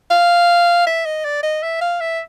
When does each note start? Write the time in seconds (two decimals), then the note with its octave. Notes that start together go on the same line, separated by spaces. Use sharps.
0.11 F5
0.87 E5
1.06 D#5
1.25 D5
1.43 D#5
1.62 E5
1.81 F5
2.01 E5